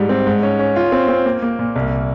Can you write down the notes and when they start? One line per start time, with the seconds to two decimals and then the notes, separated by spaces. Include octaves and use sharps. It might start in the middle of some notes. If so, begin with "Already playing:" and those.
Already playing: G#2 G3
0.09 C4
0.27 G#2
0.43 C#4
0.59 C#4
0.76 F4
0.92 C4
1.08 C4
1.26 A#3
1.42 A#3
1.59 A#2
1.76 C2